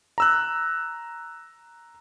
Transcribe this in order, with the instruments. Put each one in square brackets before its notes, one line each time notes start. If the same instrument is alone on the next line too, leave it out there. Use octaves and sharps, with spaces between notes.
[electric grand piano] A#5 E6 F#6